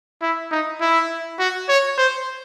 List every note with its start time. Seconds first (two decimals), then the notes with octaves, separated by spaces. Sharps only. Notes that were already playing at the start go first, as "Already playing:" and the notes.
0.22 E4
0.51 D#4
0.81 E4
1.39 F#4
1.69 C#5
1.98 C5